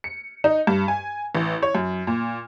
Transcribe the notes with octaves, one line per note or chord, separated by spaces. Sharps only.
C#7
D#4
G2
G#5
A1
C#5
F#2
A#2